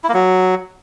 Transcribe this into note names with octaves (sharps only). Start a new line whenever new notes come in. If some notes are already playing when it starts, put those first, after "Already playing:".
E4
A#3
F#3